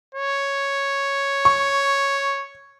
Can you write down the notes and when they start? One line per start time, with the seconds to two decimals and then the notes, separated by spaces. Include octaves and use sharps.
0.15 C#5
1.45 C#6